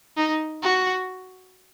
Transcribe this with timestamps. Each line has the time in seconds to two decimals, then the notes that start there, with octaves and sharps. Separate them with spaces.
0.17 D#4
0.63 F#4